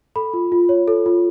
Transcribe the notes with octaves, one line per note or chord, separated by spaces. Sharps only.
A4 B5
F4
F4
C#5
A4
F4